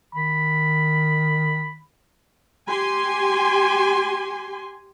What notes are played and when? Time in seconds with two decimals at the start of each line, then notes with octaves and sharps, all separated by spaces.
0.15 D#3 B5
2.68 G4 G#5 C6